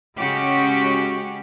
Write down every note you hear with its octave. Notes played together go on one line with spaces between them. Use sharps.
C#3 G#3 C#4 F#4 G4